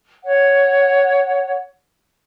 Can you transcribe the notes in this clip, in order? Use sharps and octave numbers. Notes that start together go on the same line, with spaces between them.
C#5 F#5